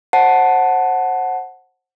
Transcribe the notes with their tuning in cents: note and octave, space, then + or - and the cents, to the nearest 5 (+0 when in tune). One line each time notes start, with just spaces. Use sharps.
C5 +25 F#5 +0 A5 +0